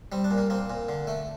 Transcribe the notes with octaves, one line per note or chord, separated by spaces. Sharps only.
G3 C4
D4
A#2
A#3
A#3 C4
A#2
D3
A3